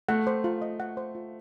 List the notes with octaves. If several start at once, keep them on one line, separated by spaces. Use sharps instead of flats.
A3 F#5
C5
F4
D#5
F#5
C5
F4